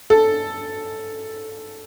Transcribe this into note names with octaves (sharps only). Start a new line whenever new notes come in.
A4